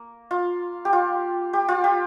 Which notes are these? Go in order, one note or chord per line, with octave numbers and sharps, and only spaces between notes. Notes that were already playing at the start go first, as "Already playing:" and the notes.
Already playing: A#3
F4
G4
F4
G4
F4
G4